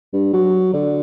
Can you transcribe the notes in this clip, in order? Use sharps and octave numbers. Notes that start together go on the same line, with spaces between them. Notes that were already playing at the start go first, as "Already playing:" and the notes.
G2
F#3
D3